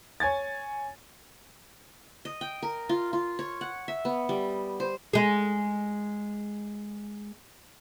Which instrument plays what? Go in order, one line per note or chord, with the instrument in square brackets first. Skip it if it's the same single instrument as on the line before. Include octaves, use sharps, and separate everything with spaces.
[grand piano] C#5 G#5 G#6 A6
[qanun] D#5
G5
A#4
F4
F4
C#5
F#5
E5
B3
G3
C5
[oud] G#3 G#4